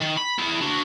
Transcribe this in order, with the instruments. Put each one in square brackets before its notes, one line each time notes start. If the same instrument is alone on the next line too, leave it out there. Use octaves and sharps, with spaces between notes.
[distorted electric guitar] D#3
B5
E4 G#4
D4 F#4